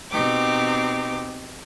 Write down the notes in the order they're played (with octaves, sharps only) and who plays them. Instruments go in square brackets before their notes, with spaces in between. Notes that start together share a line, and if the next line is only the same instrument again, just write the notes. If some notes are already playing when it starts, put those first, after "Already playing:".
[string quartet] B2 C4 D#4 G4 D6